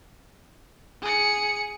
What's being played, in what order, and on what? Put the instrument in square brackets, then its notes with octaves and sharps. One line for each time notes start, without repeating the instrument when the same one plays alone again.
[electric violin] G#4 C#7